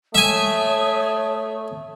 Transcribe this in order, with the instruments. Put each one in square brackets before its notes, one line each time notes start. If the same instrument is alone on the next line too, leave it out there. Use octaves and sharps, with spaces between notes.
[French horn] A3 [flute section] C#5 D#6 [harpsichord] E5 G#5